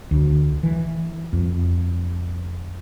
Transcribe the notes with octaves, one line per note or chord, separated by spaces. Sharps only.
D2
E3
F2